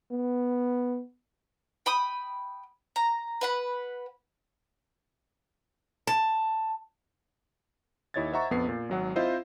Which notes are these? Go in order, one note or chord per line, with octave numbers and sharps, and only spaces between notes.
B3
G5 B5 D#6
A#5
B4 F#5 B5
A5
D#2 E4 C#5 D#5 G#6 A6
C5 D#5 E5 F#5 A#5 C#6
A#1 F2 B3 B4 C7
A#2
G#1 F#3 F#5
C4 E4 F4 C5 D#5 E5